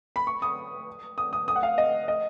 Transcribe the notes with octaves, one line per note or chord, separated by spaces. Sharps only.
B5
C#6
D#6
D#6
D#6
D#6
F#5
F5
D#5
D#5